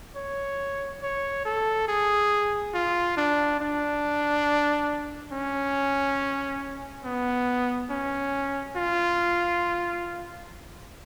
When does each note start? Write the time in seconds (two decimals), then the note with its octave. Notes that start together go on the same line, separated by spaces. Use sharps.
0.16 C#5
1.02 C#5
1.45 A4
1.89 G#4
2.74 F4
3.17 D4
3.60 D4
5.32 C#4
7.05 B3
7.90 C#4
8.76 F4